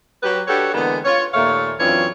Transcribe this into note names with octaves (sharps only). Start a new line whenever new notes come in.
F#3 G4 B4
D4 F#4 G4 A4 B4 C#5
D3 E3 G#3 A#3 B3
F4 C#5
D#2 A#2 A3 C#5 E5 F5
F#2 E3 C4 D4 F4 C#5